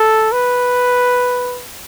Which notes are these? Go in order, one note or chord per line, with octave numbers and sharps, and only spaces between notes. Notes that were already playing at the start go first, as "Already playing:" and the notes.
Already playing: A4
B4